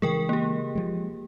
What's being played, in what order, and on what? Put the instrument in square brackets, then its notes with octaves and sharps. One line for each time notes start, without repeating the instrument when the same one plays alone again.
[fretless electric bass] C#3 E3 G#3 [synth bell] G#4 A#4 G5
[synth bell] A#3 G4
[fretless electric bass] F3 G#3